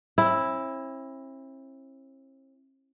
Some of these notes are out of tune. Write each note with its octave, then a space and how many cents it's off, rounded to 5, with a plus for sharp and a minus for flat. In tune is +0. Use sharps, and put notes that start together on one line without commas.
C4 +45 E4 +0